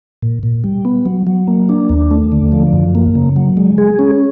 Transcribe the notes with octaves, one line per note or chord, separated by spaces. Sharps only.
A#2
A#2
G3
B3
F#3
F#3
A#3
D4
D#2
A3
D3
F3
F#2
A#3
C#3
F#3
G#3
G#4
C#4